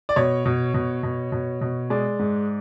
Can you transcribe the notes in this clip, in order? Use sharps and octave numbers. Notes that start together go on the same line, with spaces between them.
D5
B2 C#5
B2
B2
B2
B2
B2
G#3 D5
G#2